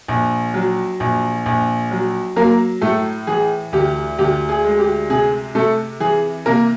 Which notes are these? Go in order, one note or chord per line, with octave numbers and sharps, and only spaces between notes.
A#1
F#3
A#1
A#1
F#3
F#3 A#3 A#4
A2 A3 A4
E3 G#4
D2 G4
D2 G4
G#4
G#3
G4
C3 G#4
C3 A3 A4
E3 G#4
C3 A#3 A#4